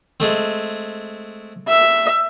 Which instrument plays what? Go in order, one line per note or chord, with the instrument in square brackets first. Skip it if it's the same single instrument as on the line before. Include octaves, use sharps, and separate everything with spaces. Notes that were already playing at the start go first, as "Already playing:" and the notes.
[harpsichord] G#3 A3 C4
[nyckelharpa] E5